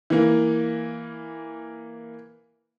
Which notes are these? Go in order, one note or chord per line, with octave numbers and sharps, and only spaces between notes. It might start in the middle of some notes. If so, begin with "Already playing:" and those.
E3 A#3